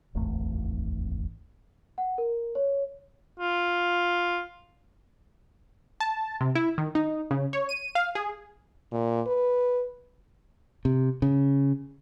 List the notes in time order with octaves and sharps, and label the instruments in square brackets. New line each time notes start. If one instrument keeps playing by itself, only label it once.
[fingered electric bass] D1 G#1 E2 A3
[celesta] F#5
A#4
C#5
[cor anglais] F4
[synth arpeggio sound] A5
C3
E4
D#3
D#4
C#3
C#5
D#7
F5
G#4
[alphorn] A#2
B4
[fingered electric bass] C3
C#3